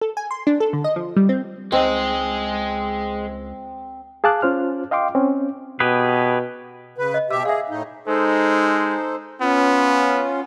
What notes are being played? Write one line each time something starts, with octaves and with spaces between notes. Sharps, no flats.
A4
G#5
C6
D4
A4
D3
D#5
F3
G3
C4
C#2 G#3 C4 D#4 G#4 C5 F#5
G#4 F5 A5 D6 F#6
C#4 F4 C5 F6
D#5 F5 G5 C6 D6
C4 C#4
B2 G4 G#4 B4
C#3 B4
D#5
B2 G4 E5 E6
G#4 E5 F5
A2 D#4
G#3 D#4 A4 C5
B3 C#4 F4